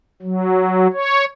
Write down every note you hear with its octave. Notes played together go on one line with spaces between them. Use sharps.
F#3
C#5